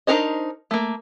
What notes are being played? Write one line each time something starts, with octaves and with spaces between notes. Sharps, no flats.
D4 D#4 A#4 C5 D#5
A3 A#3